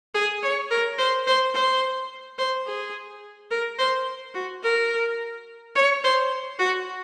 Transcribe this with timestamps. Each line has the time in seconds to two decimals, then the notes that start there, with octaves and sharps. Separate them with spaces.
0.15 G#4
0.43 C#5
0.71 A#4
0.99 C5
1.27 C5
1.54 C5
2.38 C5
2.66 G#4
3.51 A#4
3.79 C5
4.34 F#4
4.63 A#4
5.75 C#5
6.04 C5
6.59 F#4